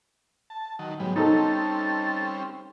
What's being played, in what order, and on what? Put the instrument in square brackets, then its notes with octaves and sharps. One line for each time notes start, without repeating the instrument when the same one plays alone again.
[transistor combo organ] A5
D#3 F#3
[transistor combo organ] G#2 G3 B3 [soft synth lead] F#3
[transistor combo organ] G3 C4 C#4 [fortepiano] D#4 A4 [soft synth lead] A6